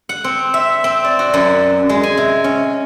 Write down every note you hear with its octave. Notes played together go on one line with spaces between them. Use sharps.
F#5
C4
E5
C4
D5
F#4
F#2
G#3
G#5
C3
C#4